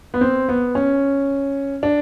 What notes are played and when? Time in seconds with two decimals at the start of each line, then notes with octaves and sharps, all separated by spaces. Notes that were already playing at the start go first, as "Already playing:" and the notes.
0.14 B3
0.21 C4
0.49 B3
0.75 C#4
1.83 D4